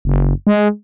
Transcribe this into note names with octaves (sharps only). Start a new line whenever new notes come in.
F#1
G#3